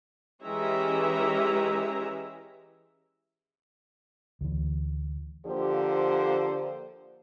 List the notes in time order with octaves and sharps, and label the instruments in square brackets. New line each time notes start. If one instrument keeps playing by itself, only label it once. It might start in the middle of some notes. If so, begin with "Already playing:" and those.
[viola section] E3 G#3 C#4 G4 E5 A#5
[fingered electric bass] D2 E3
[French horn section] D3 F3 A#3 G4 C5